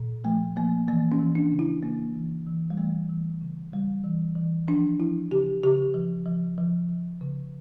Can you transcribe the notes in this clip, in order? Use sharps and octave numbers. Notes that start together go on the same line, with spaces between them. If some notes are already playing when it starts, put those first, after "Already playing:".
Already playing: A#2
F3 A3
F3 A#3
E3 A#3
C#4
E3
D4
C#3
E4
C#3 A#3
E3
E3
G3
E3 A3
E3
C#3
C#3 G3
E3
E3
F3 D4
F3 E4
C#3 G4
C#3 G4
F3
F3
F3
F3
C#3